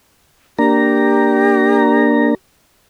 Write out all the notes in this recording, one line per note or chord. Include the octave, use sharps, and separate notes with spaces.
A#3 D4 G4 A#5